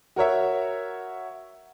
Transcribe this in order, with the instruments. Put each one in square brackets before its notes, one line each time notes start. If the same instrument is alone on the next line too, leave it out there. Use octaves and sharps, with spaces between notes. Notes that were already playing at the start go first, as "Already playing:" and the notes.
[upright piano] F#4 A#4 C#5 E5